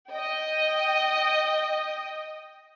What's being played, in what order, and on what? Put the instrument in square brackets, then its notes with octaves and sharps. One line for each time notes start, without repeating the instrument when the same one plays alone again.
[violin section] D#5 G5